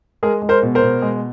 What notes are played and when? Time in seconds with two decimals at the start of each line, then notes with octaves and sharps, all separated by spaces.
0.23 G#3 G#4 A#4
0.42 G#3
0.49 A#4 C5
0.63 B2
0.75 A#4 C5
0.82 B2
1.02 G#3